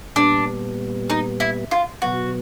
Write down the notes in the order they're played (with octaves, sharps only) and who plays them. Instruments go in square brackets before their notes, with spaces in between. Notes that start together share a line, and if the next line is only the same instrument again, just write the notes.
[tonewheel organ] A#2 G3 B3 [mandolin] D4
[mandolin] D#4
E4
F4
[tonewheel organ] B2 F#3 B3 [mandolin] F#4